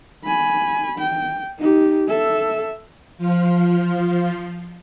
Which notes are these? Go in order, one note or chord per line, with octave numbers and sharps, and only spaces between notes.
G#5 B5
G5
D#4 G4
A4 E5
F3 F4